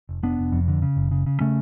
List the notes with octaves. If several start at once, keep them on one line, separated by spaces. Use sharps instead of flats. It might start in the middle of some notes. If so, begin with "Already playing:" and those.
F1
F1 B3 D4
F1
F2
D3
C#3
F#1
C#3
C#3
C#3 A3 C#4